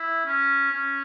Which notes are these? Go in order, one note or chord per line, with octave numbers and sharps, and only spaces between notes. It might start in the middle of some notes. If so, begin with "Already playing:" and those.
Already playing: E4
C#4
C#4